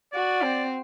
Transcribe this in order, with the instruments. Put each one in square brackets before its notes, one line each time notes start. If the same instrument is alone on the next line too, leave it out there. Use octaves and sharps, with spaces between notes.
[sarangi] F#4 [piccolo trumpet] D5
[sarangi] C4